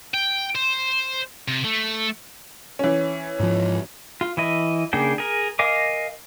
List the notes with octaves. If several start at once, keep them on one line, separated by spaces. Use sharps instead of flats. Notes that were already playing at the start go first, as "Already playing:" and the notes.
G5
C5
C3
A3
E3 C#4
G#2 F3
F4
E3 E4 D#5
C#3 A#3 D4 G#4 G5
G#4 A#4
A#4 D#5 F5 G#5 D6